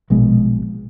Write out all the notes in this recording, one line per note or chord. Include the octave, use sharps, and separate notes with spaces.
A#1 B2 G#3